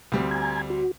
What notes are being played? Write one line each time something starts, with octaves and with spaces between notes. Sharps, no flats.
D2 G3 C4
G#5 A#5 G#6
F#4